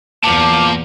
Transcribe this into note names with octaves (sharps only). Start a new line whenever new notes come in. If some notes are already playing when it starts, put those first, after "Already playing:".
E2 A#2 F4 A5 D6